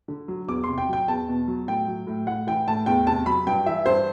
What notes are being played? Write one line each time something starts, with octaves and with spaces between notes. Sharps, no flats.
D3
F#3
E2 D6
C6
C3
G5
F#3 G5
E2 A5
B2
F#3
A2 G5
F#3
A2
A2 F#5
E3 G5
A2 A5
E2 G5
C3 A5
F#3 B5
G2 G5
E3 E5
G2 C5